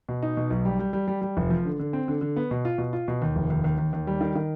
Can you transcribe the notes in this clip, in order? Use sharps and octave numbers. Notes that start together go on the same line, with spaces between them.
B2
D#4
B2
B1
G3
G3
G3
G3
G3
F1
F3
D3
D3
C4
D3
D3
B3
B2
F4
B2
F4
B2
D#2
F1
D#2
D#2
D#2
D#2
G3
D#3
D#3